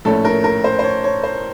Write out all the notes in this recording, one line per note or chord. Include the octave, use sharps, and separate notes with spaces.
A#1 A2 A3 C#4 A4
A#4
A#4
C5
C5
C#5
C#5
C5